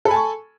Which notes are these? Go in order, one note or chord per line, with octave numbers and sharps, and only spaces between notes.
A4 G#5 A5 B5 C#6